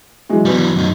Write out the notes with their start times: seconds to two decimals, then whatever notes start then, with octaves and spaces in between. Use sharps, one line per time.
0.29 E3 F#3 G#3
0.45 E3 F#3 G3 B3 F#4
0.76 F#2 D#4